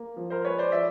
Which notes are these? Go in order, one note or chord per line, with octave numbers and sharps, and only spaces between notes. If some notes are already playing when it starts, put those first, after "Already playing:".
Already playing: A#3
F3
A#4 C5
G#3 B4 C#5
C5 D5
F3 D5 E5